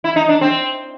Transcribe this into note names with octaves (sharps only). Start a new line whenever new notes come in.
E4
D#4
D4
C4